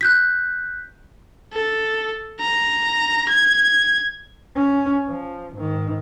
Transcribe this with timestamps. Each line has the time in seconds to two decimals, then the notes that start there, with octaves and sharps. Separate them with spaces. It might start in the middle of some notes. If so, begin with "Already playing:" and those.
0.01 F#6 G6 B6
1.53 A4
2.40 A#5
3.29 G#6
4.55 C#4
5.09 F3
5.55 G#2 D#3